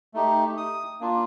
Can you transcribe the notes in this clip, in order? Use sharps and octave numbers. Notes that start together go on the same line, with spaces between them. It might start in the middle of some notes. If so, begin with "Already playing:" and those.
A3 D#4 G4
D#6
A#3 D4 F4